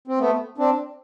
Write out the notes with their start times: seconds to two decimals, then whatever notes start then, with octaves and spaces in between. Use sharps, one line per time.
0.08 C4
0.18 A3 B3
0.58 C4 D4